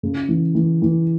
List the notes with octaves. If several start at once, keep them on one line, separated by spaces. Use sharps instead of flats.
C#3
E3
E3
E3